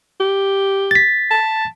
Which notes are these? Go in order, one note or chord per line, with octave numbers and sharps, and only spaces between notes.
G4
A6 B6
A5